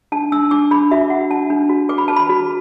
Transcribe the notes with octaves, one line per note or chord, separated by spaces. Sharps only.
D4 A5
D4 E6
D4 D6
D4 B5
F#4 E5
D4 F#5
D4 A5
D4
F#4
B4 D6
B5
B4 A5
B5
F#4